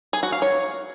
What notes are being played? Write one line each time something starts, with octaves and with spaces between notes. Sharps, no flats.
G#4
F#4
F5
C#5